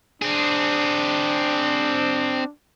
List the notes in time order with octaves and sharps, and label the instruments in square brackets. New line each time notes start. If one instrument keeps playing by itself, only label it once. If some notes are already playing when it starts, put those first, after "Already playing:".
[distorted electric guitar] C4 G#4 [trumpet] D4